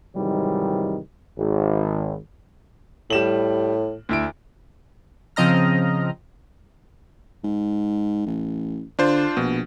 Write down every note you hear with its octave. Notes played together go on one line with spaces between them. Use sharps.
G#2 C3 D#3 E3 F#3 G3
G#1
A2 G3 E7 F#7
D2 E4 D7
C#3 F3 C4 D#5 A#5 F6
G#2
A1
D3 D4 F4 C5
A#1 B2